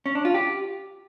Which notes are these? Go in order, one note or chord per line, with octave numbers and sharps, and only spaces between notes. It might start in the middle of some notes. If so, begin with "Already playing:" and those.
C#4
D4
F4
G4